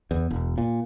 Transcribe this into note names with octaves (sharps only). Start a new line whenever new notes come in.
E2
E1
A#2